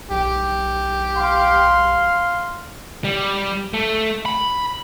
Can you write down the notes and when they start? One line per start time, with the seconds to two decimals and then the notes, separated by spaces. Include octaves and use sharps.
0.11 B1 G4
1.17 F5 C6
3.04 G3
3.74 A3
4.25 B5